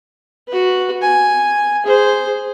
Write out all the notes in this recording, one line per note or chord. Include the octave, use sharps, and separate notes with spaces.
F#4 B4
G#5
G#4 C5